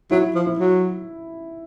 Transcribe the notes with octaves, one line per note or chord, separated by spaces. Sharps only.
F#3 E4
F3
E4
F#3